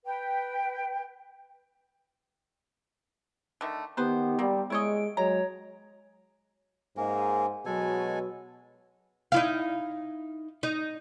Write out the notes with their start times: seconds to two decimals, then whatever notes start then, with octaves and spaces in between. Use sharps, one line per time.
0.05 B4 G5
3.61 D3 D#3 A3
3.97 D#3 B3 D#4 G4 B4 C5
4.39 G3 A#3 C4
4.70 G#3 E4 C#5 D#5 D7
5.17 F#3 G#3 C#5 A#5
6.97 G#2 A#3 C#4
7.66 B2 F#3 G#3 A4 G#5
9.32 D#4 E4 F5
10.63 D#4